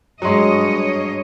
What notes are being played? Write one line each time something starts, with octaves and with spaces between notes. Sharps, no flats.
G2 F#3 G#3 C#5 D#5